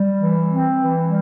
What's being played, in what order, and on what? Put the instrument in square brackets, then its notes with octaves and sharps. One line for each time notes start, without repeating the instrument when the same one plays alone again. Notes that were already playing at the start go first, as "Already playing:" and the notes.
Already playing: [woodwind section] G3
E3
C4
E3
G3